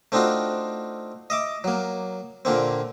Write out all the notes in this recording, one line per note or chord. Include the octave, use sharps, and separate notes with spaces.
A3 C4 D4 D#4 F4 F#4
D#5 E5 D6
F#3 A#3
A#2 D3 A#3 C4